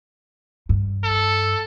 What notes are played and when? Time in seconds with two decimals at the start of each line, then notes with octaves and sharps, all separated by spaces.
0.69 G2
1.04 A4